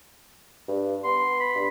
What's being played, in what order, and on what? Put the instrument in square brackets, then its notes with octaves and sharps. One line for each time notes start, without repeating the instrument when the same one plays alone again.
[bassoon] G2
[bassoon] B3 [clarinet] C6
[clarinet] B5
[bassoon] G2